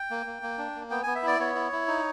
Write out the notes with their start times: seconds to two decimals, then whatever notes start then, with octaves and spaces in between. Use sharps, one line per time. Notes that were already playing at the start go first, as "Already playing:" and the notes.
Already playing: G5
0.10 A#3
0.26 A#3
0.42 A#3
0.58 D4
0.75 A#3
0.90 B3 G5
1.03 B3 G#5
1.15 E5
1.23 E4 D5
1.40 B3 C#5
1.55 E4
1.72 E4
1.88 D#4